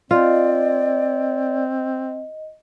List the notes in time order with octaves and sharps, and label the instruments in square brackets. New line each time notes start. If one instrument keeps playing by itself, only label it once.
[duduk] C4 [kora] F4 [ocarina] D5 [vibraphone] D#5